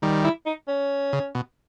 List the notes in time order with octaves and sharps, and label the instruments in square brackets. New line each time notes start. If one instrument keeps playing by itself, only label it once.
[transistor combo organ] D#3 G3
[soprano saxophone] E4
D#4
C#4
[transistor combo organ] C#3
B2